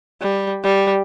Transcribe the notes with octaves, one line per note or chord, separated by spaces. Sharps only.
G3
G3